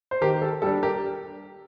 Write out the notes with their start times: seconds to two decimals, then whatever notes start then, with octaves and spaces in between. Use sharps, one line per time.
0.11 C5
0.21 D#3 G4 A#4
0.42 A4
0.62 G3 D4 A4
0.83 G4 A#4